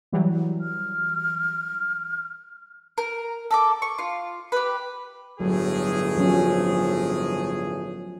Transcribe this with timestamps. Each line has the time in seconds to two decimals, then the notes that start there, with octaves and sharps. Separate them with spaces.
0.12 E3 F#3 G3
0.61 F6
2.98 A#4
3.51 A4 A#5 D6
3.82 C#6
3.98 F4
4.52 G4 B4
5.40 G1 A2 F#3 G#4
6.17 F3 F#3 C#4